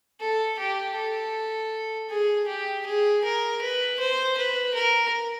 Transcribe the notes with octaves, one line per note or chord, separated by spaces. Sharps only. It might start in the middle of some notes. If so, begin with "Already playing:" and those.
A4
G4
A4
G#4
G4
G#4
A#4
B4
C5
B4
A#4